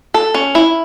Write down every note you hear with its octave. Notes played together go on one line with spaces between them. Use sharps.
A4
C#4
E4